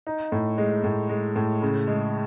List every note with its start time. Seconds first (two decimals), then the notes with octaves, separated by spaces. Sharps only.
0.07 D#4
0.32 A2
0.58 G#3
0.84 A2
1.09 G#3
1.36 A2
1.62 C#3
1.88 G#3